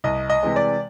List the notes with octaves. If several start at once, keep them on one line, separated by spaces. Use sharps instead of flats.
C2 D#5
D#5
C3 E3 G#3
D5